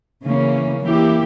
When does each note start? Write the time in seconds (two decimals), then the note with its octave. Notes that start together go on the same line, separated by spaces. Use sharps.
0.23 C#3 E3 A#3 C#4
0.81 E3 A#3 E4 G4